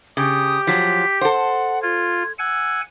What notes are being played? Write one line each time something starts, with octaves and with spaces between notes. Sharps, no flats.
C#3 G4 D#6
F3 F#3 B6
A4 C5 F#5
F4 G#6
F#5 G#5 E6